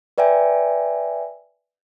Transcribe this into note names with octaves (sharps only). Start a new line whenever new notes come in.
B4 D5 E5 G5 G#5